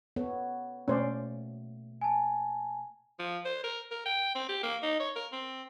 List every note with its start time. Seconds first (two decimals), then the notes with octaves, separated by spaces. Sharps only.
0.16 B3 A4 C#5
0.88 B2 A3 A#3 C#4 C5 D5
2.01 G#5 A5
3.19 F3
3.45 C5
3.64 A#4
3.91 A#4
4.06 G5
4.35 C4
4.49 G4
4.63 A#3
4.83 D#4
5.00 C#5
5.16 A#4
5.33 C4